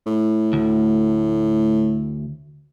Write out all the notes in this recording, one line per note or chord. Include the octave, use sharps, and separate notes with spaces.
A2
D2